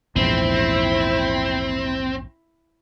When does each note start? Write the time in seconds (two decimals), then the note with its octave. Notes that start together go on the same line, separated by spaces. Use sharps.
0.16 A#1 E2 G#2 C4 E4